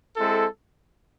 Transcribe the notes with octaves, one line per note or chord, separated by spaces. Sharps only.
G#3 C4 E4 A4